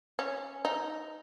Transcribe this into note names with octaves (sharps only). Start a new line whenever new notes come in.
C#4
D#4